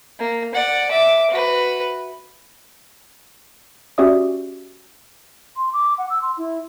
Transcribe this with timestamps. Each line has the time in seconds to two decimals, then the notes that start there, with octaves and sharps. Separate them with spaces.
0.19 A#3
0.54 D5 F#5
0.91 E5 D6
1.31 F#4 B4
3.98 C#4 F#4 G4 D5 E5 D#6
5.57 C6
5.73 D6
5.98 F#5
6.10 E6
6.22 C6
6.38 E4